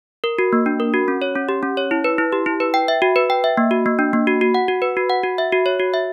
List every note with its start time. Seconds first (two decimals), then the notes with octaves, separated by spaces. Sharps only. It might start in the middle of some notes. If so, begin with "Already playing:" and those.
0.24 A#4
0.38 F#4
0.53 A#3
0.66 D4
0.80 A#4
0.94 F#4
1.08 C#4
1.22 C#5
1.35 C#4
1.49 G4
1.63 C#4
1.77 C#5
1.91 E4
2.04 B4
2.18 E4
2.32 G4
2.46 E4
2.60 B4
2.74 G5
2.88 E5
3.02 F#4
3.16 B4
3.30 G5
3.44 E5
3.57 A#3
3.71 F#4
3.86 A#3
3.99 D4
4.13 A#3
4.27 F#4
4.41 F#4
4.54 F#5
4.68 F#4
4.82 B4
4.97 F#4
5.10 F#5
5.23 F#4
5.38 E5
5.52 F#4
5.66 C#5
5.79 F#4
5.94 E5